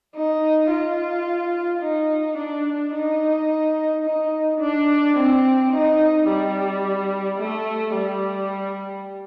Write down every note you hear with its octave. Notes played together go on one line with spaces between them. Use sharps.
D#4
F4
D#4
D4
D#4
D#4
D4
C4
D#4
G3
A3
G3